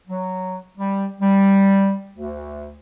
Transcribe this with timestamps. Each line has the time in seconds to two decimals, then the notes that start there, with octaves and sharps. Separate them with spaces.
0.08 F#3
0.78 G3
1.21 G3
2.14 D2